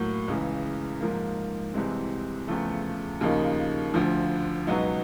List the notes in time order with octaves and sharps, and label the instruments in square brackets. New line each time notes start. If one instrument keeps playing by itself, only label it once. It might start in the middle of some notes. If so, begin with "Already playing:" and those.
Already playing: [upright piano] A2 F#3 A#3
C#2 C#3 E3
G#2 F3 A#3
C2 C3 E3 G#3 C4
E2 C#3 F3 A3
D#2 C#3 F3 A#3 D#4
D2 D3 F3
C#2 B2 F#3 B3 D#4